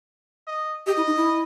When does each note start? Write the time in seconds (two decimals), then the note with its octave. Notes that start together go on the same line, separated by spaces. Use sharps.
0.47 D#5
0.86 G4 D#5
0.97 E4
1.07 D#4
1.16 E4